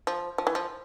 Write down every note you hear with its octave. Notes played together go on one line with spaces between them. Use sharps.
F3
F3
E3
F3